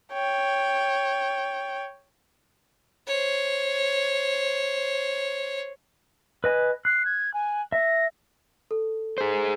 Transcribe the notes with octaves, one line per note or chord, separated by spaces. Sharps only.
C#5 G5
C5 C#5
B4 D#5 G#5
F#6 C7
G#6
G#5
E5 A#6
A4
G#4 C5